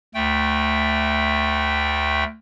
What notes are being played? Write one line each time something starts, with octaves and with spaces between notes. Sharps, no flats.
D2 A3 G5